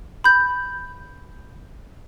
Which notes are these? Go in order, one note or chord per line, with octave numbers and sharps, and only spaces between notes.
B5 G6